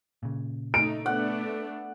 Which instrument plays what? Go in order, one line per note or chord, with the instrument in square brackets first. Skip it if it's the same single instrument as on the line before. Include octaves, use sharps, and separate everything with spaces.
[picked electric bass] A#2 C#3
[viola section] A3 D#4 [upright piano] D7
[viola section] A3 B3 D4 [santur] F#5